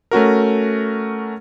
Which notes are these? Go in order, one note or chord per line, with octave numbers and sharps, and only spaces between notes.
A3 C#4 F#4 A#4